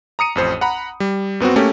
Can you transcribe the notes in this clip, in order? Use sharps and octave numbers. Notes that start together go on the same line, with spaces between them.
A#5 D#6 C#7 D#7
A1 F2 C5
F#5 A#5 B5
G3
F#2 B3 C4 F#4
A3 A#3 C#4 G4